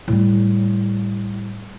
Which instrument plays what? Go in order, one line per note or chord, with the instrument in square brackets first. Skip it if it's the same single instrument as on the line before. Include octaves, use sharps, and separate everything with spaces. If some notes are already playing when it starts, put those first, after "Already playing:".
[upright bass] A2 G3